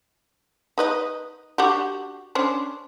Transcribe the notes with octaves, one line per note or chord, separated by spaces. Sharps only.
D#4 B4 D#5
D4 F#4 G4
C#4 D4 C5